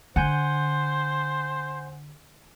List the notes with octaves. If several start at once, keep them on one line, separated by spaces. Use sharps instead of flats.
D3 C5 F#5 G#5 G6